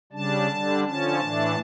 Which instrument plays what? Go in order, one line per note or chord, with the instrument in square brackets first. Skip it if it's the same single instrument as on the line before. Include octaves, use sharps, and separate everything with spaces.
[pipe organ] C#3 G3 D4 A5
D3 G3 D4
D3 F3 C#4 A5
A2 E3 A3 D4